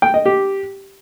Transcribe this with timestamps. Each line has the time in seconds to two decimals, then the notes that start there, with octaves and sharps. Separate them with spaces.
0.02 G5
0.14 D#5
0.26 G4